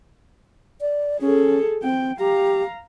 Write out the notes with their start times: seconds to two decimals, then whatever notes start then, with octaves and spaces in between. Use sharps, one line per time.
0.81 D5
1.21 C#4 G#4 A4
1.83 C4 G5
2.19 G4 F5 A#5